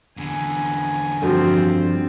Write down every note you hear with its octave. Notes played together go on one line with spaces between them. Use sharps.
E2 D3 G#5
G2 F3 C4 F#4 A4